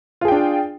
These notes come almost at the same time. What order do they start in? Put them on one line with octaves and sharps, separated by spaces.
F4 G#4 G5 D4